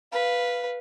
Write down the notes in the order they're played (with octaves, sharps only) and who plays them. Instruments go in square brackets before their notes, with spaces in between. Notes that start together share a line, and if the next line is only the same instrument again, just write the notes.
[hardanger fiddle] B4 F5